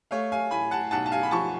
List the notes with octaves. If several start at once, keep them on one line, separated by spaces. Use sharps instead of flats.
A3 C#5 F5
F5 G#5
A2 G#5 B5
F#5 A5
B1 F#5 A5
A5
F5 G#5
B5
F3 A5 C#6